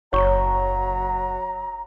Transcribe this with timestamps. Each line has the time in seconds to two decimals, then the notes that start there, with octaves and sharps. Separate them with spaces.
0.13 F#1 F#3 C#5 A#5 C#6